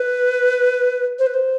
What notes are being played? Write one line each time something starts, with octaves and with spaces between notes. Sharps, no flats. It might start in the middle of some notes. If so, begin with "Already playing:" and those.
Already playing: B4
C5
B4
C5